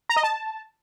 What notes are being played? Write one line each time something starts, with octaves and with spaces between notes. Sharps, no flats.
A#5
D#5
A5